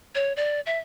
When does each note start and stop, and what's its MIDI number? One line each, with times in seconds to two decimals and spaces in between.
0.15 0.33 73
0.37 0.60 74
0.66 0.78 76